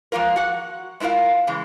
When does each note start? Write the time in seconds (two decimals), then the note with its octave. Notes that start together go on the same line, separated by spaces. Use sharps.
0.12 F3 G#3 A#3 F4 A#4
0.36 F#4 F#5
1.00 G#3 E4 F4 A#4 F5
1.47 C#3 E3 G#3